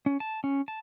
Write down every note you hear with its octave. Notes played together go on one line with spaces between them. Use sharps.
C#4
A5
C#4
A5